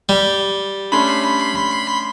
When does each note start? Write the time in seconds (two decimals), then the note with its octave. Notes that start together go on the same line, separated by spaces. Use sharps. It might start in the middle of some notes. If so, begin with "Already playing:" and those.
0.09 G3
0.92 A3 C#4 D4 B5 C6